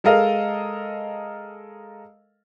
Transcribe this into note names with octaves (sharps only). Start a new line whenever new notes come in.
G#3 A4 A#4 D#5 F5